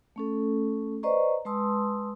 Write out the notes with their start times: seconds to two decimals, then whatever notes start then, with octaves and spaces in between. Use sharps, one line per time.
0.16 A3 C#4 A4
1.03 B4 C5 D5 D#5 A#5 C#6
1.45 G#3 B4 A5 C6 D#6 E6